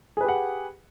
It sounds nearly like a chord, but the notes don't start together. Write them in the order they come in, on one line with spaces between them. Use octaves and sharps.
G#4 B4 G4 F#5